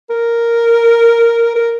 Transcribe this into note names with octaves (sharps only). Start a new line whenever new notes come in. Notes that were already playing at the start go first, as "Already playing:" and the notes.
A#4
A#4